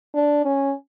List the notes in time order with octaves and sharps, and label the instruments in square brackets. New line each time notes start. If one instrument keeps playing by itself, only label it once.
[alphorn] D4
C#4